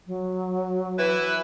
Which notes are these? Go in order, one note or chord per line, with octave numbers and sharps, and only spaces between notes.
F#3
E3 E4 B4